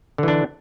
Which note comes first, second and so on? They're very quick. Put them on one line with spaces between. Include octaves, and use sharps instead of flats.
D3 E3 D4